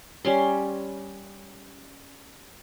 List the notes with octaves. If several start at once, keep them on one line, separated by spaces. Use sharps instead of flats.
G3 C#4 C6